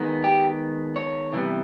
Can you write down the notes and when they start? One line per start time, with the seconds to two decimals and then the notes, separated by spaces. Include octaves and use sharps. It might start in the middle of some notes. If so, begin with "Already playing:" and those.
Already playing: D#3 G#3 B3
0.24 G4
0.96 C#5
1.33 C3 E3 G3 B3